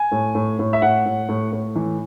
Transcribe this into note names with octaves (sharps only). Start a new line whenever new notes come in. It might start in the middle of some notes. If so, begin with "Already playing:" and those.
Already playing: G#5
A2
A2
A2
E5
A2 F#5
A2
A2
A2
E3